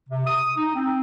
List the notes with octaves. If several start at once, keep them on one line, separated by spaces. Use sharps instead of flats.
C3
D#6
D#4
C4